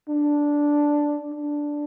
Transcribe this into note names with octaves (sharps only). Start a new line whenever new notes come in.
D4
D4